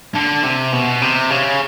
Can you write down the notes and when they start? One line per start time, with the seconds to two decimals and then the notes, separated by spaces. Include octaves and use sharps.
0.16 D3
0.44 C3
0.73 B2
1.02 C3
1.30 C#3